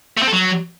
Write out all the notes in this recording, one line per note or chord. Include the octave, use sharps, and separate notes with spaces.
A3
C4
A4
F#3